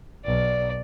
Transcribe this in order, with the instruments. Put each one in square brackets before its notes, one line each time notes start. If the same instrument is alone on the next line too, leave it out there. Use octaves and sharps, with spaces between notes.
[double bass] B1 [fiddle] D5